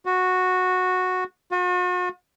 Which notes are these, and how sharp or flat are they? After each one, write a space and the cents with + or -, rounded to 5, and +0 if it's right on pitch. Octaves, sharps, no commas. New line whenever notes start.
F#4 -10
F#4 -45